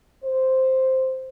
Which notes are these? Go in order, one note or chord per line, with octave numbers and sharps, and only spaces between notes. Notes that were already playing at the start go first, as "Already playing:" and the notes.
C5